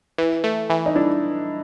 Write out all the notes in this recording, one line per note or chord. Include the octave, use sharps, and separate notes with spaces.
E3
A3
E3
D#4
D4 E4